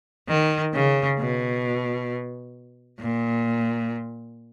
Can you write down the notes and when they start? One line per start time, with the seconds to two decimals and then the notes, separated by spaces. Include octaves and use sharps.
0.29 D#3
0.74 C#3
1.19 B2
3.00 A#2